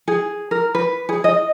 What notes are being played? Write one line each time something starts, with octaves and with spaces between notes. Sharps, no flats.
G#4
A#4
B4
G#4
D#5